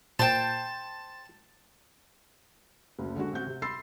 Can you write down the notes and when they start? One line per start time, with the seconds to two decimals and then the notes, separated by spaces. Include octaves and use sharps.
0.19 A#2 C5 G5 A5
2.99 F#1 D2
3.15 D3 G#3 D4 F#4
3.32 A1 C4 F#4 G6
3.47 C3
3.62 B5 C6 E6 A6 C7